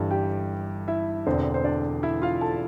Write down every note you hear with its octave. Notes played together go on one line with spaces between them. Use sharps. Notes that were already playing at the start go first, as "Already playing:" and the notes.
Already playing: G1 G2 E3 G3 A4
G4 G5
E4 E5
E1 E2 D3 C4 C5
C5
D4 D5
E4 E5
F4 F5
A4 A5